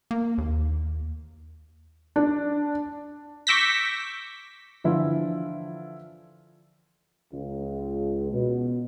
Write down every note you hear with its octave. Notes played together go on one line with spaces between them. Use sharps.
A#3
D#2
D4
C#6 D6 E6 G6 A#6 B6
D3 E3 F3 E4 F4
C#2
B2